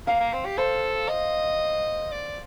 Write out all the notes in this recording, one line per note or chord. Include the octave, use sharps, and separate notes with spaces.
A#3 F5
A#3
C4
G4
A4 C5
D#5
D5